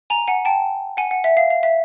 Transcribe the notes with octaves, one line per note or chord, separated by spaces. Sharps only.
G#5 A#5
F#5 G#5
G5 A5
F#5 G#5
F#5
E5
F5
F5
E5